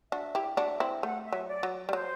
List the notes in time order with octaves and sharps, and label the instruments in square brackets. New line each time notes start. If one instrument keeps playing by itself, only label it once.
[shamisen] D4 F#4 [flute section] E5
[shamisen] E4 G4
[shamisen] D4 F#4 [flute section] E5
[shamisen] C4 E4
[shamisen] A3 [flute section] F#5
[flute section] E5
[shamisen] F#3
[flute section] D5
[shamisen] F#3
G3
[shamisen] F#3 [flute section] C5